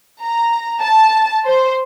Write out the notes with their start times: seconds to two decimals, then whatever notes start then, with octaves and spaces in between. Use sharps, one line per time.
0.23 A#5
0.82 A5
1.45 C5